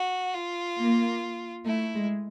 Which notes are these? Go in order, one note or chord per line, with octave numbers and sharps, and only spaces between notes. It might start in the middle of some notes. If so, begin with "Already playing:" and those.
Already playing: F#4
F4
A#3
A3 E4
G#3